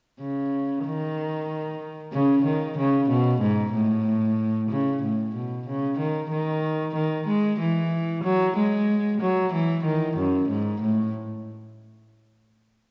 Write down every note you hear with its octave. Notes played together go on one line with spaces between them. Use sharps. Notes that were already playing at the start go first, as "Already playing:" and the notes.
C#3
D#3
C#3
D#3
C#3
B2
G#2
A2
C#3
A2
B2
C#3
D#3
D#3
D#3
G#3
E3
F#3
G#3
F#3
E3
D#3
F#2
G#2
A2